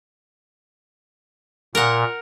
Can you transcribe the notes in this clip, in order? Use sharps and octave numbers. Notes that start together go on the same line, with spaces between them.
A#2 A#4 F#5